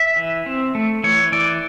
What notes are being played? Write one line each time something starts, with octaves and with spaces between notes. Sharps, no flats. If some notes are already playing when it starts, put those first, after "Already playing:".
Already playing: E5
E3
C4
A3
E3 C#5
E3 D5